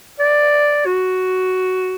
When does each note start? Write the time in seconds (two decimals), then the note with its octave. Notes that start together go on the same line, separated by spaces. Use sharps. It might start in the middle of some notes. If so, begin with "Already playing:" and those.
0.20 D5
0.86 F#4